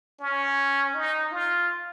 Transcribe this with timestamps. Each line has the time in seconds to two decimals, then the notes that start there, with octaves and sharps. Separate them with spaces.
0.20 C#4
0.95 D#4
1.32 F4